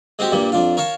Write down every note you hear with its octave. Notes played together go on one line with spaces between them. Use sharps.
G#3 C4 F#4 G4
G2 A#2 G3 A#3
F2 D4 F4
A#4 C#5 F5 A5